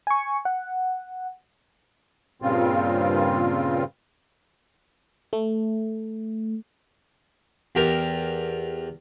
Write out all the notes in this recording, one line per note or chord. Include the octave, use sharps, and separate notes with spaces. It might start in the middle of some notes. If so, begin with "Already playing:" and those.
G#5 C#6
F#5
G2 A#2 C#3 C4 F4
A3
E2 G4 A#4